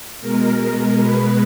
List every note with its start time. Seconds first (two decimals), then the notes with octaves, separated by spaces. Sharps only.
0.21 B2 G#3 A#4
0.60 A#4
1.00 B4